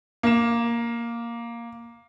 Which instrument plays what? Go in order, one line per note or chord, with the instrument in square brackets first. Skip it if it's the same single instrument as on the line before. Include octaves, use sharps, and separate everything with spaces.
[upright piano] A#3 E7